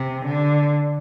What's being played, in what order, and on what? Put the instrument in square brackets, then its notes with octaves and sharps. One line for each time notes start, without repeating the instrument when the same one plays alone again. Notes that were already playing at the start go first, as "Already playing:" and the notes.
Already playing: [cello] C3
D3